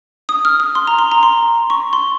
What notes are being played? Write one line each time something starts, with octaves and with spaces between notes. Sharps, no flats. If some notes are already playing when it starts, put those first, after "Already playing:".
D#6
F6
D#6
C6
A#5
C6
A#5
C6
C#6
C6